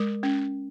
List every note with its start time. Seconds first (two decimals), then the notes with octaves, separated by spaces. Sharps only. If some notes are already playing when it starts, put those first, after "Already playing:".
Already playing: G#3 A#4
0.23 C#4